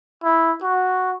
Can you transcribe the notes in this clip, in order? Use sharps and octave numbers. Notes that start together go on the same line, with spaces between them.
E4
F#4